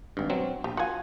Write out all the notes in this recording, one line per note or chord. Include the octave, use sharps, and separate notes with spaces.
G#1 G2
B2 F#3 C4
A#1 G4
F4 F#4 F#5 G#5